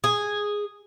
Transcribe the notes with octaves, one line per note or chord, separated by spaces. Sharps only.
G#4